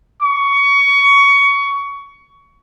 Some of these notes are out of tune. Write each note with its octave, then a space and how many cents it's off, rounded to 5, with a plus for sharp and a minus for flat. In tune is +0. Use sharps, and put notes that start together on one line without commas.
C#6 +20